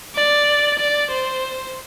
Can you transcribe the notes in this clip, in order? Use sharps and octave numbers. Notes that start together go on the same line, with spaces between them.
D5
D5
C5